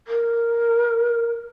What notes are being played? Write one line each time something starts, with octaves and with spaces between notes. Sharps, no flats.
A#4